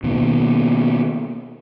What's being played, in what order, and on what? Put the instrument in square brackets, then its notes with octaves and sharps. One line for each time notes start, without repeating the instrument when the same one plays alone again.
[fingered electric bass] B2 D#3 A#3